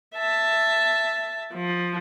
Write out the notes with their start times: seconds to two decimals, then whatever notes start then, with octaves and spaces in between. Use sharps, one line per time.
0.16 E5 A5
1.54 F3